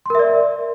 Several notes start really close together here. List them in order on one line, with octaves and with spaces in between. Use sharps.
C6 A#4 E5 D5